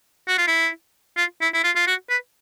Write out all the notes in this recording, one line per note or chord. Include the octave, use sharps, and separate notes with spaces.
F#4
F4
E4
F4
E4
E4
F4
F4
F#4
B4